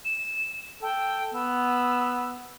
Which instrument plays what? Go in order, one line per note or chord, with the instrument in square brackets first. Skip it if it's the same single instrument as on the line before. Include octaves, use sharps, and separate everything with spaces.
[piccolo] E7
[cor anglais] A4 [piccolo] G5
[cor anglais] B3 [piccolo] E6